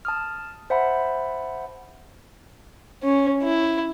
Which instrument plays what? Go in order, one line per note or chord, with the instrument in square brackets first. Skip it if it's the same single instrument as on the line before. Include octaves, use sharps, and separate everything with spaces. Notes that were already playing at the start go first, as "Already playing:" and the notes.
[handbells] A5 D#6 F6
C5 E5 F#5 A5 B5
[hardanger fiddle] C#4
E4